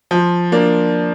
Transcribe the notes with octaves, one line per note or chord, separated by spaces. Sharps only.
F3
A#3 D4